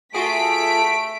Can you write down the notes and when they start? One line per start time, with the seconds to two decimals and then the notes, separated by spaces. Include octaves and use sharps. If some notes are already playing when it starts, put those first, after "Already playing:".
0.14 A3 F4 F#4 G#4 B6 D7